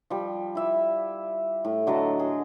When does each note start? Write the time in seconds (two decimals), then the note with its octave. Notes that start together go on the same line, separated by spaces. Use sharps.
0.10 F3 G3
0.55 E4 E5
1.65 A2
1.87 D3 F#3 D#5 A5
2.19 G#4